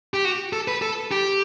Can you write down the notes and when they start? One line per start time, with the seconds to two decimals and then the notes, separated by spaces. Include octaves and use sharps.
0.14 G4
0.25 F#4
0.53 A4
0.68 B4
0.82 A4
1.12 G4